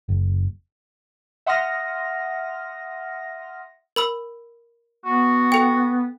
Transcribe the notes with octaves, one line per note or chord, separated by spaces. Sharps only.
F#1
E5 F#5 C6 D#6 F6 A#6
A#4 B5 E6
B3 F#4
A4 G5